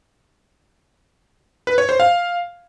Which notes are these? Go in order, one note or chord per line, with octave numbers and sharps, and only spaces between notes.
B4
C#5
C5
F5